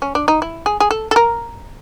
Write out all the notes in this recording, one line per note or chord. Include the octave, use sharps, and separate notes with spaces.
C#4
D4
D#4
E4
G#4
G#4
A4
A4
A#4